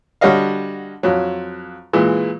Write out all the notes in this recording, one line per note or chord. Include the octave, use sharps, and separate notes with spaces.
D3 G3 F#4 C#5 D#5 F5
F2 F#3
A#2 E3 G#3